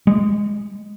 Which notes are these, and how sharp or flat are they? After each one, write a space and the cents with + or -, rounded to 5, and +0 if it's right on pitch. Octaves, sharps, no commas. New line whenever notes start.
G#3 -5